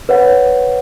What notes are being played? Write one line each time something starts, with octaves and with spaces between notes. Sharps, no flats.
B4 C#5 F#5